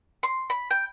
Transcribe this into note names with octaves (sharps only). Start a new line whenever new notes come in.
C6
B5
G5